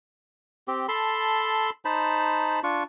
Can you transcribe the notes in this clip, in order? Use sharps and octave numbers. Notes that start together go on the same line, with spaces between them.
C4 G4
A4 A5 B5 C6
D#4 C5 A5 B5
D4 F4 C#6